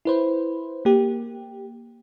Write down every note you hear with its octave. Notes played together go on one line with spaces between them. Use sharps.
E4 B4 C5
A#3 G4